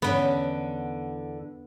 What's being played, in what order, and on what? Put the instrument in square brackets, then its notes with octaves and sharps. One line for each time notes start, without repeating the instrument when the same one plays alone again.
[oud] E2 D3 C#4 [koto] B3